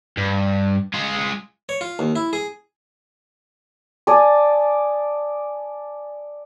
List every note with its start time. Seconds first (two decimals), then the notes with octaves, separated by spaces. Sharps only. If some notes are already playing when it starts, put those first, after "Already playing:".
0.17 G2
0.94 G#3 F4
1.69 C#5
1.81 F4
1.99 D#2
2.16 E4
2.33 G#4
4.07 D5 G#5 A5 D#6